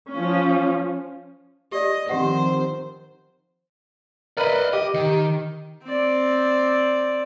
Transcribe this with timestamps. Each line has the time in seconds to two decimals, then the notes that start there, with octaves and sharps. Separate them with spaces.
0.13 F3 C#4
1.72 G4 D5 D#5
2.09 D#3 F3 C4 G4 C5 F#5
4.37 A#4 B4 D5 D#5 B5
4.73 G4 D#5
4.94 D#3
5.84 C4 D5